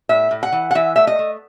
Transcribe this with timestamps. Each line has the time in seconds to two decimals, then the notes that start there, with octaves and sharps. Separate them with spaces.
0.09 A2 E5
0.31 A2
0.43 F#5
0.52 E3
0.71 F#5
0.75 E3 E5
0.96 A3 E5
1.07 D#5
1.19 A3